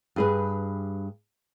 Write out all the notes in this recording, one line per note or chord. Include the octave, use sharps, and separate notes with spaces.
G2 G#4 B4